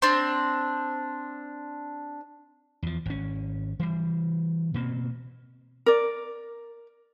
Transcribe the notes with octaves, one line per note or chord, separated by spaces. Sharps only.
C4 D4
E2 F3
G#1 C#4
E3 G3
B2 A#3 C4
A#4 D5